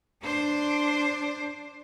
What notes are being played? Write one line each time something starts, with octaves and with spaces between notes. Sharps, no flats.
D4 C5